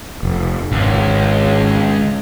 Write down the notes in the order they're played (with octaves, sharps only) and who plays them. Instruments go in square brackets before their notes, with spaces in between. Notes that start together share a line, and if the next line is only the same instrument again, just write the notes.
[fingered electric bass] F1
[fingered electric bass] G#1 [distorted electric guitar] C#2